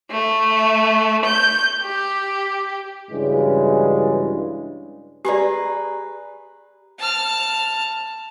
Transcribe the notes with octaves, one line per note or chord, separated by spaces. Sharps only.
A3
G6
G4
G2 C#3 E3 F#3 G#3 D4
G4 G#4 B4 D5 A#5
A5 F6